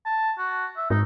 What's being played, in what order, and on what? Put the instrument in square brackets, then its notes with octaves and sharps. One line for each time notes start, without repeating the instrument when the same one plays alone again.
[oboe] A5
F#4
E5
[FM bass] G#2 [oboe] D#4